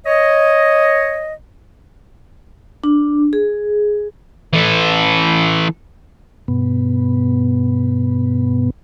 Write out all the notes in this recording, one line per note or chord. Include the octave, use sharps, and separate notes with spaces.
C#5 D#5
D4
G#4
E3 A4
G2 B2 B3